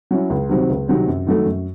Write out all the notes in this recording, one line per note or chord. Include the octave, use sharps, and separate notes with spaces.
F#3 C#4 E4
C#2
C3 D#3 F#3 C4
C#2
C3 D#3 F#3 C4
F#2
D#3 F#3 A3
F#2